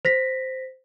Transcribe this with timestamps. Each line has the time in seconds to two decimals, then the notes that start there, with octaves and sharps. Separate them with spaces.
0.05 C5 A#6 B6